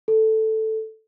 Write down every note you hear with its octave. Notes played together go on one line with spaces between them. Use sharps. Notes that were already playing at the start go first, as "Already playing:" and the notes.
A4